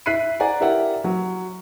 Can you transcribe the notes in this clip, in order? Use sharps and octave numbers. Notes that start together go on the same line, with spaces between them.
E5 F#6 B6 C7 D#7
D5 F#5 G#5 A#5
E4 G4 A#4 D5 E5 F#5
F#3